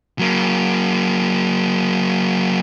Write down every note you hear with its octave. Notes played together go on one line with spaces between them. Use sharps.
F#3 A#3